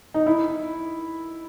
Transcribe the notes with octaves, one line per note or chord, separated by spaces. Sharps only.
D#4
E4